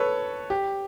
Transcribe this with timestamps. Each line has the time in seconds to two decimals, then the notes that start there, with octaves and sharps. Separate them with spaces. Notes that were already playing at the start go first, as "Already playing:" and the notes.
Already playing: A4 B4 C#5
0.50 G4